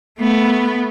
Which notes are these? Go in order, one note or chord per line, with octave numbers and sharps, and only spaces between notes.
A3 B3